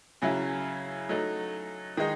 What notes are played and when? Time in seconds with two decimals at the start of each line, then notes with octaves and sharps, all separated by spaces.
0.22 C#3 F#3 C#4 E4
1.09 F#3 A3 D#4
1.97 D#3 G#3 D#4